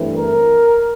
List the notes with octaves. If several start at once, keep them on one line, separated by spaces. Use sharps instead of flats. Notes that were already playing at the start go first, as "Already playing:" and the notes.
Already playing: G2 E3 A3 C4
A#4